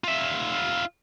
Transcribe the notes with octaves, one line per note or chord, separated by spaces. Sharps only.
F4 E5